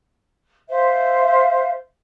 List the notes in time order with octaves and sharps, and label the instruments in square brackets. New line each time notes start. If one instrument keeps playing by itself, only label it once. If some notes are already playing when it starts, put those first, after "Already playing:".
[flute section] C5 E5 F5